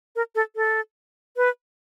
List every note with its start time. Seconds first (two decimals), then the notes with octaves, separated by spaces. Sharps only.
0.16 A#4
0.35 A4
0.56 A4
1.37 B4